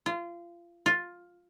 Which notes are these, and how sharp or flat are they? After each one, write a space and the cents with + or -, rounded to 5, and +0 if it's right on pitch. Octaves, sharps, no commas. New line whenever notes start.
F4 -25
F4 +10